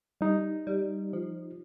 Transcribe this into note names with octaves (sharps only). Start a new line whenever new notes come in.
G3 D#4
G3
F3